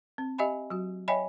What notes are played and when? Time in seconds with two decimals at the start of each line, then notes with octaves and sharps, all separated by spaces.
0.18 C4
0.38 G4 D#5 E5 G#5 B5
0.70 F#3 F#4
1.08 C#5 D#5 E5 G5 G#5 B5